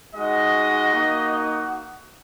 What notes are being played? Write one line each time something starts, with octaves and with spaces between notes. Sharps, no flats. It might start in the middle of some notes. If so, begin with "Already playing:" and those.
G#3 D#4 F#4 D#5
A#3 D#4 F#4